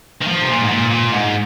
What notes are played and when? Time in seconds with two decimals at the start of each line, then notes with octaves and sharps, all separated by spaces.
0.21 D#3
0.27 F3
0.42 C3
0.48 A#2
0.61 G#2
0.69 A#2
0.90 A#2
1.12 G#2